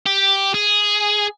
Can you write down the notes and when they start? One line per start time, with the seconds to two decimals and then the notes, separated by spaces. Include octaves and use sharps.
0.06 G4
0.54 G#4